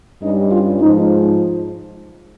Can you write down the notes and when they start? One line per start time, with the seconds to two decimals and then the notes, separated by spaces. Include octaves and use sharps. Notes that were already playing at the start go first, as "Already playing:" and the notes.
0.21 G2 G3 C#4 D#4
0.51 F4
0.80 G#2 F3 G#3 D#4